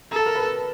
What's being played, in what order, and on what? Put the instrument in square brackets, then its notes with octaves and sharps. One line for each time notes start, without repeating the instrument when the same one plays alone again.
[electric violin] A4 [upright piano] A#5
[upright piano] A5
A#4 A#5
B4 B5